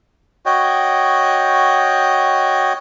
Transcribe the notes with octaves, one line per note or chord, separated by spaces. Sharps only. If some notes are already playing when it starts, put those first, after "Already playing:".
F#4 C#5 D#5 G5